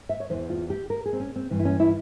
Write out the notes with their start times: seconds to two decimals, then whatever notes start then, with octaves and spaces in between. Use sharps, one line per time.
0.09 E5
0.20 C#5
0.30 E2 C#3 E3 C5
0.50 F4
0.70 G4
0.90 A#4
1.06 G#4
1.13 C4
1.20 C#4
1.36 C4
1.51 G2 E3
1.60 E4
1.65 C#4
1.80 E4